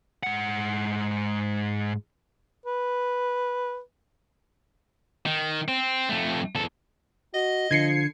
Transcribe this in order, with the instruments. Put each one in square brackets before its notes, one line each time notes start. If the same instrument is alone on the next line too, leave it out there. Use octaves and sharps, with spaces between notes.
[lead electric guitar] G#2 F#5
[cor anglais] B4
[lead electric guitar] D#3
C4
F2 A3
E2 A4
[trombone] F#4 [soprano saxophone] D#5
[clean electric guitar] D3 [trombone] F3 [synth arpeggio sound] G#6 C7 C#7